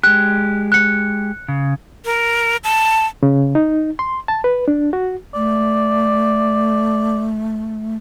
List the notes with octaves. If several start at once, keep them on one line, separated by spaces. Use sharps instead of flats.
G#3 G4 F#6
F#6 C#7
C#3
A#4
A5
C#3
D#4
C6
A5
B4
D4
F#4
A3 D5